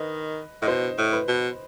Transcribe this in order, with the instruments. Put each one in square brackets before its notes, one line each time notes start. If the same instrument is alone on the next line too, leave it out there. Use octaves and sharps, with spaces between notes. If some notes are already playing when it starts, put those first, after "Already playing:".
Already playing: [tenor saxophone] D#3 [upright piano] B4 D#5
[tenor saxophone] A2 [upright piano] D#5
[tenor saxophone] B2 [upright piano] C5
[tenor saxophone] A2
[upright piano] B4
[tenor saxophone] B2